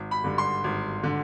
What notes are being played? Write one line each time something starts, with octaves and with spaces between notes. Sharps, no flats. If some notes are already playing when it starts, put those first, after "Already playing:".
Already playing: G#1
B5
G2 D3
C6
G#1
D3